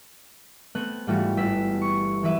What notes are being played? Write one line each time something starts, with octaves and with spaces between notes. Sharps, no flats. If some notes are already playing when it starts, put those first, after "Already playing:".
A3 B3 C4 F#6
G#2 E3 G3 A3 F4 F#4
G1 E6 B6
C#6
E3 F#3 E4 B4 E5